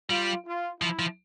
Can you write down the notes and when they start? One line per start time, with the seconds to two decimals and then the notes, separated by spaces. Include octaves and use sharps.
0.10 G3 F4
0.46 F4
0.81 F3 E4
0.99 F3